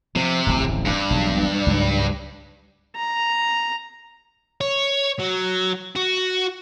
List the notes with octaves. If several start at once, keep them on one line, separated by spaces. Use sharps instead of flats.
C3 F3
D1 A1 F2
G2
E1 B1 C3
C#2 G#2 F#3
A#5
C#5
F#3
F#4